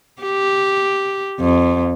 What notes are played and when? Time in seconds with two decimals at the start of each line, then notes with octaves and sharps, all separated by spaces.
0.22 G4
1.40 F2